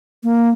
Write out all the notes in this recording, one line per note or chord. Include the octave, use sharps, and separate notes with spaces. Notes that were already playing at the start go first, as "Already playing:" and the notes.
A#3